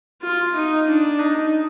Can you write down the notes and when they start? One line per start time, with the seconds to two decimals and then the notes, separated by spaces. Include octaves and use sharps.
0.23 F4
0.55 D#4
0.88 D4
1.19 D#4